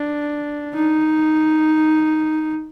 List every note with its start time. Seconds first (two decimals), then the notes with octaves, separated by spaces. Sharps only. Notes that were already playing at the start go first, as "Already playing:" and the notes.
Already playing: D4
0.74 D#4